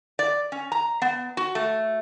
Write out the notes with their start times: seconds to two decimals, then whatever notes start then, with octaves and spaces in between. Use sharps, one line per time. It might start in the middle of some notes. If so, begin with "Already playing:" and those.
0.19 D5
0.52 C#4
0.72 A#5
1.02 B3
1.37 F#4
1.55 A3